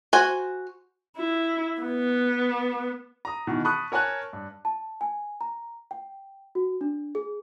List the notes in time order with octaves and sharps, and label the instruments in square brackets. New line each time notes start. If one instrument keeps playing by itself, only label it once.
[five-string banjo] F#4 C5 G#5
[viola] E4
B3
[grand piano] A#5 D#6
B2 D#3 E3
A5 B5 C#6 D#6 F#6
A#4 C#5 G#5 A5 F#6
G2
[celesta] A5
G#5
A#5
G5
F#4
D4
G#4